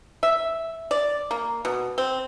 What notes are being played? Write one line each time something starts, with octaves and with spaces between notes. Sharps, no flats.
E5
D5
A#3
B2
C4